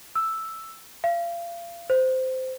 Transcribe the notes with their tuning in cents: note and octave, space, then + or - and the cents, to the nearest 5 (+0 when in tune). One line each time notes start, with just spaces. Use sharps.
E6 +0
F5 -30
C5 -15